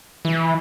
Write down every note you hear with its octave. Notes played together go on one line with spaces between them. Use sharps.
E3